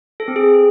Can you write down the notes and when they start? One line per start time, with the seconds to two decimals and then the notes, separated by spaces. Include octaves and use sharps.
0.20 A4
0.28 C4
0.36 G#4